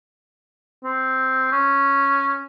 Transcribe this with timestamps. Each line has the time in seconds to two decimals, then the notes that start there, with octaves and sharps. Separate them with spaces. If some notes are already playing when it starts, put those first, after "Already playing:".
0.84 C4
1.52 C#4